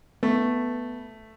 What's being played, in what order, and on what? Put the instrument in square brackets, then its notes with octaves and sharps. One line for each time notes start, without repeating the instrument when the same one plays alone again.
[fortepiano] A3 [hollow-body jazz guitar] B3